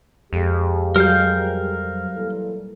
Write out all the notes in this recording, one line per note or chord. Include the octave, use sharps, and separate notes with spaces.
F2 G#3 G4
F#3 G3 A#4 F5 G6
A#2 E3 A4